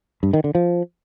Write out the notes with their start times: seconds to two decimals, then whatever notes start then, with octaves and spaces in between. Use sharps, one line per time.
0.23 G2
0.33 D#3
0.44 D3
0.55 F3